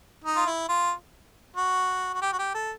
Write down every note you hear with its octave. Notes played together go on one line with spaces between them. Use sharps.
D#4
F4
E4
F4
F#4
F#4
G4
F#4
G4
A4